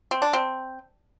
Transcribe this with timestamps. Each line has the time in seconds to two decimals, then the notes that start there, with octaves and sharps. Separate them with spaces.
0.11 C4
0.22 D4
0.33 C4